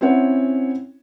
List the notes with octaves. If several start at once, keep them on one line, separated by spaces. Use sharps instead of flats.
C4 C#4 E4 C#5 F#5